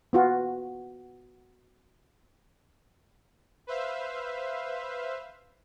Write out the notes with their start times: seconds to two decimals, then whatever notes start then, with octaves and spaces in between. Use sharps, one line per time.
0.13 B3 F4 F#4
3.67 B4 C5 E5 F5